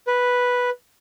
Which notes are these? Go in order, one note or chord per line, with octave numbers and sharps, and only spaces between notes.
B4